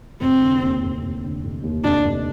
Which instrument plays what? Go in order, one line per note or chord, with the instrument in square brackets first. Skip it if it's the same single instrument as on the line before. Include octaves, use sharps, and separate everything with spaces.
[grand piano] F1 [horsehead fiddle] C4
[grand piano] D3
D#2
F1
F1
D3
F1
D#2
[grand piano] F1 [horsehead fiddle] D4
[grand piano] F1